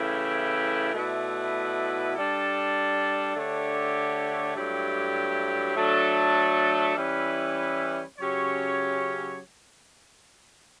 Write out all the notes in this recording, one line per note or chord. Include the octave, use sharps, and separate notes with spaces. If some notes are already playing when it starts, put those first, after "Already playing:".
Already playing: C#3 E3 A3 E4 G4
B2 A3 E4 B4 D5
G3 D4 A4
D3 A3 D4 G4 C#5
G2 F#3 A3 E4 G4
F#3 A3 D4 A4
E3 G3 C#4 E4 B4
C#3 F#3 C#4 G4 C#5